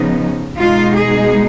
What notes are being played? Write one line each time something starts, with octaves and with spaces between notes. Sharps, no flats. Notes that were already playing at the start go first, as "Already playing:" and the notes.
Already playing: C#3 F3 B3 D#4
B2 G#3 D#4 F4
G#4